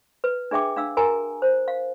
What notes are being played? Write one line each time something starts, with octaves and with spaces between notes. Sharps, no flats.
B4
D4 G#4 E5 G5 D6
D4 F5 E6
F#4 A#4 G#5 A#5
C5
F5